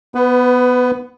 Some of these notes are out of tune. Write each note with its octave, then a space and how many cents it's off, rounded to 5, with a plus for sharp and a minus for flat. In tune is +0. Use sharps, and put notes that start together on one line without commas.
B3 +0 B4 +25